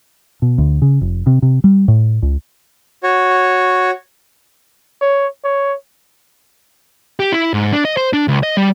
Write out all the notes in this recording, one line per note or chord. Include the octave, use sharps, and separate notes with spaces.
B2
D2
C#3
F1
C3
C3
G3
A2
C#2
F#4 C#5
C#5
C#5
G4
E4
G#2
D4
D#5
C5
D4
C#2
D#5
G3